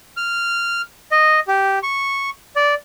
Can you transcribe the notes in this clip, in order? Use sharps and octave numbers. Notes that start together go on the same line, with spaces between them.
F6
D#5
G4
C#6
D5